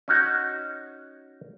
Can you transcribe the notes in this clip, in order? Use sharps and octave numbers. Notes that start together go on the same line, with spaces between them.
C#4 D#4 F#4